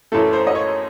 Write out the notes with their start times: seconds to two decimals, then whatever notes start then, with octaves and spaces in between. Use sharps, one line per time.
0.12 F#2 E3 A3 A4
0.33 C5
0.47 D#5
0.55 C#5